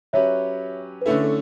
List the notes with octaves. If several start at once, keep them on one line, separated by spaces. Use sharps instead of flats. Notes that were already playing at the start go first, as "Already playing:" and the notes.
F#3 C#4 G4 B4 C#5 E5
B4
D3 A3 C#4 E4 A4
A4